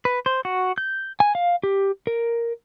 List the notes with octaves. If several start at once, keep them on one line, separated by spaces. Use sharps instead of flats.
B4
C5
F#4
G6
G#5
F5
G4
A#4